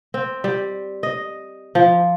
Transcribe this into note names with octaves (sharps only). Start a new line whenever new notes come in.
C4
G3
D#5
F3